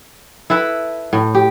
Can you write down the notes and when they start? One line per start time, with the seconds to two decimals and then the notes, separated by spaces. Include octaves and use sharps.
0.50 E4 A4 B4
1.13 A2
1.35 G4